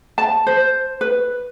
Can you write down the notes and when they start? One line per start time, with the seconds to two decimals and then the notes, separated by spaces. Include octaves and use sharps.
0.18 A5
0.47 C5
1.01 B4